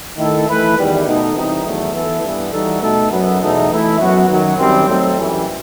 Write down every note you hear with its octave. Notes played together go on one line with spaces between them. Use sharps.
D#3 A3 E4 A4
E3 A3 E4 B4
E2 D#3 G3
B2 A3 D#4 A4
C3 E3 G3 D#4
E2 D#3 F#3 A3
E3 B3 E4 A4
G2 E3 B3
E3 G3 D#4 F#4 A4
B2 A3 D#4 A4
F#2 F#3 B3
E2 B2 A3 D#4
E3 A3 E4
F#2 F#3 B3 F#4
F#2 D#3 F#3
F#2 D#3 G3 C4
F#3 A3 C4 D#4 A4
F#2 E3 G3